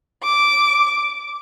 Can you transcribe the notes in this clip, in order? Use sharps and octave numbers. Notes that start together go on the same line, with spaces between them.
D6